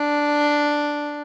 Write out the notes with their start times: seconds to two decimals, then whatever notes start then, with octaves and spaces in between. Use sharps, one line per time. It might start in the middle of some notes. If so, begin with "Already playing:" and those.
Already playing: D4